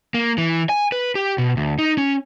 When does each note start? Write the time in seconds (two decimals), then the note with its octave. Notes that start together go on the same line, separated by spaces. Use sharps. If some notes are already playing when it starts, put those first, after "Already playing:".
0.14 A#3
0.38 E3
0.69 G#5
0.92 B4
1.15 G4
1.38 B2
1.57 D2
1.79 D#4
1.98 C#4